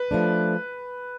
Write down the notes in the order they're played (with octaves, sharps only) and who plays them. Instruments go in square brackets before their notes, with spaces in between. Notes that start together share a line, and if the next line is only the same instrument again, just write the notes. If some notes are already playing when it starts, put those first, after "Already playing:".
Already playing: [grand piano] B4
[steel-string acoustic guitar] F3 A3 D4